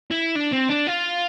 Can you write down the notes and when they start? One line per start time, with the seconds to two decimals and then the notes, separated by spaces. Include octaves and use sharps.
0.11 E4
0.36 D4
0.53 C4
0.70 D4
0.87 F4